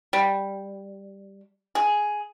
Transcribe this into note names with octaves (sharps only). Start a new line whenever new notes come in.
G3
G#4